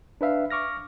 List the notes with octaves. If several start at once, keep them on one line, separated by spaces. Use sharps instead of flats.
D4 B4 E5 F5
C#6 D6 F6 A#6